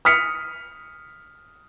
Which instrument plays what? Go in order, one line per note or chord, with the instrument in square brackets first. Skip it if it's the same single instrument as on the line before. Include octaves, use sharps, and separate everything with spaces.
[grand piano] D#6 F6 B6 C#7